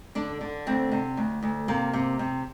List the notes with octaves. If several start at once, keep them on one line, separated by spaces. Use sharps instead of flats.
D3 D4
D3
D2 C4
C3
D2
D2
C3 A#3
C3
C3